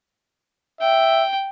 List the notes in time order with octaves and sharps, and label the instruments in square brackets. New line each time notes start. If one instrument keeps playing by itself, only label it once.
[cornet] E5 [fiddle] G5